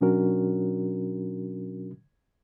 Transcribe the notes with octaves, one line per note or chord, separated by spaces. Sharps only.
B2 F#3 C#4 D4 F#4 A#4